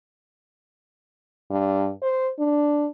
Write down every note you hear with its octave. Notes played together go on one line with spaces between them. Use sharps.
G2
C5
D4